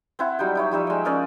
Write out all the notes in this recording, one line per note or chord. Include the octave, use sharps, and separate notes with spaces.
C4 E4 F#5
F#3 G3 D#4 G5
D#4 E4 C#5
F3 G3 D#4 E5
G#3 G5
A#3 C#4 D5 D#5